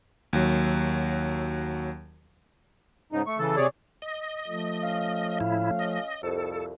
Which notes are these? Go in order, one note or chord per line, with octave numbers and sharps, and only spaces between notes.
D#2 F#3
G#2 C#3 D#4
A3 C#6
C#3 E3 A4
C3 G#4 C#5 D5
D#5
F3 A3
C#4 F5
A2 E4
D#5
C2 F2 A4